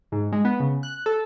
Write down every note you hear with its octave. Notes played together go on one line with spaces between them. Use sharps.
G#2
G#3
B3
C#3
F#6
A4